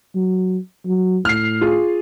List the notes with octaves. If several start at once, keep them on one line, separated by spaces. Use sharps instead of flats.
F#3
F#3
A2 F6 C7
F4 G#4